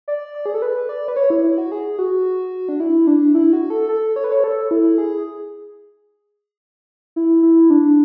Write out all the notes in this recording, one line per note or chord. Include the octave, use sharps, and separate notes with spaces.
D5
D5
G#4
A4
B4
D5
B4
C#5
E4
E4
F#4
G#4
F#4
D4
E4
D4
E4
F#4
A4
A4
C#5
B4
C#5
A4
E4
G#4
E4
E4
D4